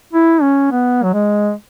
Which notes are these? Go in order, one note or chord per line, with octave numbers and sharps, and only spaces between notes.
E4
C#4
B3
F#3
G#3